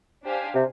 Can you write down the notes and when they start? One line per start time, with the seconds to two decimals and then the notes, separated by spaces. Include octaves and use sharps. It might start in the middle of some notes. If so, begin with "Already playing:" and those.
0.24 D4 G4 C5 F5 G#5
0.54 C3